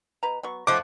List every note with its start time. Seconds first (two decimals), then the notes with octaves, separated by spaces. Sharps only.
0.23 B2 B4 A#5
0.43 F#3 B3 C#6
0.67 F3 A3 C#4 D#5 F#5 D6